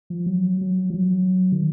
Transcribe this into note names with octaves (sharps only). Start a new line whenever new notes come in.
F3
F#3
F#3
F3
F#3
D#3